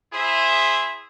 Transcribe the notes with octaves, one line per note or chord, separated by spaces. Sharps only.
E4 G#4 C5 E5